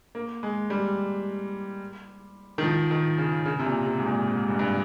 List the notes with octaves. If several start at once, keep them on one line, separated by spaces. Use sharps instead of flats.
A#3
G#3
G3
D#3
F3
D#3
C#3
C#3
C3
A#2
C3
G#2
A#2
G#2
G2
G2